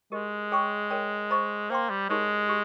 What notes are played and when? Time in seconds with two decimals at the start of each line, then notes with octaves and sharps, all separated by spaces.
0.12 G#3 G4 A#4 D#5
0.52 G#4 C#5 G5 C#6
0.90 A#4 C#5 G5
1.31 C5 D#5 A#5 C#6
1.70 A#3 C5 G5 C6
1.90 G3
2.09 G#3 D#4 G4 A#4 C#5
2.49 G4